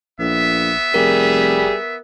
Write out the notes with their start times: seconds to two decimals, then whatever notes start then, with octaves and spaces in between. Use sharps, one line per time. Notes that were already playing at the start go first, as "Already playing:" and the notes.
0.19 A#1 B3 E5
0.94 F1 G3 G#4 A#4